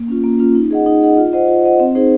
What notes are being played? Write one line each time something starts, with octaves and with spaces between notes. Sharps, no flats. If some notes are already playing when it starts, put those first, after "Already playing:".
Already playing: A#3
C#4 F4
A#3
C#4 F4
D#4
G#4 D#5 F#5
D#4
G#4 D#5 F#5
F4
C5 D#5 F#5
F4
C5 D#5 F#5
C4
D#4 G#4 C5